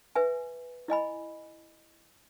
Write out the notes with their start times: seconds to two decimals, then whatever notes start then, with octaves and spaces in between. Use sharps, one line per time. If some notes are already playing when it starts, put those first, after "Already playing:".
0.15 B4 E5 G#5
0.88 E4 D#5 G#5 B5